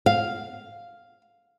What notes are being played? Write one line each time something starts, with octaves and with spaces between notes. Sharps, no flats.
F5